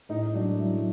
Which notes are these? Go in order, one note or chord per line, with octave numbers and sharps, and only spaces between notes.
A2 D#4
D#4
F#3 D4
F#3 E4